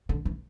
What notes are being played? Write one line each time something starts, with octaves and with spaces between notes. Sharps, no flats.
D3
E3